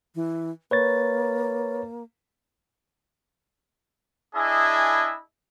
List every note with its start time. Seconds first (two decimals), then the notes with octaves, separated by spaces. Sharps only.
0.15 E3
0.71 A#3 B4 C#5 A6
4.35 D4 E4 G#4 D#5 E5 G#5